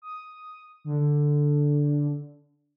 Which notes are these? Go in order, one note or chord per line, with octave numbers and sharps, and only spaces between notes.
D#6
D3